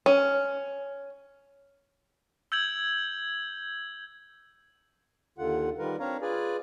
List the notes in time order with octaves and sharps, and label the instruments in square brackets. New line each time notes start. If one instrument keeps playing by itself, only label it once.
[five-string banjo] C#4
[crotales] E6 G6 G#6 F#7
[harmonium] D#2 D3 F4 F#5
D#3 G3 F4 A#4 B4
C4 D4 C#5 F5 A#5
F4 G#4 B4 D5 G#5